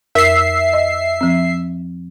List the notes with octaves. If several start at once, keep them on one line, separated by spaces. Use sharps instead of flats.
F2 A#4 E5 C7
D#5
F3 C4